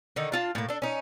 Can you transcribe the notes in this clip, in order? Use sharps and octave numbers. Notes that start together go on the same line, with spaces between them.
D3 D#3 D#4
D4 F4 A5
A2 A#3
D4 A4
C#4 D#4